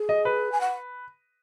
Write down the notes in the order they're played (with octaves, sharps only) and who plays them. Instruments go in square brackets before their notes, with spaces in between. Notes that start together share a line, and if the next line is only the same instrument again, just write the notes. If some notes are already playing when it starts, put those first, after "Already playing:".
Already playing: [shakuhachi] G#4
[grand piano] D#5
B4
[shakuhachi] G#5
F#5